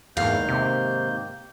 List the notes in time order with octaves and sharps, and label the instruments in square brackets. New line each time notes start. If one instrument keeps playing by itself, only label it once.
[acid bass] E2 [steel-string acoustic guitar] G#2 F5 [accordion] D#3 A#3 G6
[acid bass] C3